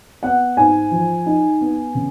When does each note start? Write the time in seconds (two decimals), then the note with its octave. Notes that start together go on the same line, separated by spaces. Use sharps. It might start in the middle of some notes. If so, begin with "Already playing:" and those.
0.23 B3 F#5
0.57 G#2 G#5
0.92 F3
1.26 D#4
1.61 B3
1.95 C#3